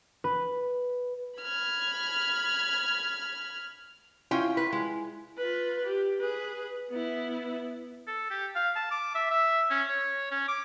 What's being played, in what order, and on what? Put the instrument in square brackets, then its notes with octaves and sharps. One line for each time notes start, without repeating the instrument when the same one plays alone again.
[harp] B4
[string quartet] B5 F6 G#6
[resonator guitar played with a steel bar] C#4 F4 G5 [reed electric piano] E4
[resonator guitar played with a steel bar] B4
G#3
[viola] F4 B4
G4
G#4 B4
B3 E4
[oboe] A4
G4
F5
A5
D6
E5
E5
C#4
C#5
C#4
D6